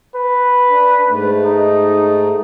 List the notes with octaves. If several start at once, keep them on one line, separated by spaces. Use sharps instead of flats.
B4
D4
G#2 A3
D#4